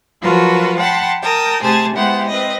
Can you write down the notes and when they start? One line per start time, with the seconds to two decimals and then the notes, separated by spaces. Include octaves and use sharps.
0.21 F3 F#3 F4 F#4 A#4 B4
0.77 F#5 G5 A5 B5 C6
1.21 A#4 G5 A5 D#6
1.61 C3 A3 G#4 C5 G#5 A5
1.95 G#3 B3 E4 G4 C5 F#5
2.27 C4 B4 D#5